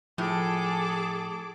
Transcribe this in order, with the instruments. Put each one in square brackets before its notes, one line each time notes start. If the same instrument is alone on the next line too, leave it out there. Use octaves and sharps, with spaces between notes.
[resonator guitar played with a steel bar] A2 [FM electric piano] F3 [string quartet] G#4 A4 D6